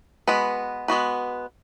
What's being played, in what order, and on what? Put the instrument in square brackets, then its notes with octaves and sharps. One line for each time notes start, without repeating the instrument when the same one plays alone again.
[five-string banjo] G#3 B3 F#4 B4
G#3 B3 F#4 B4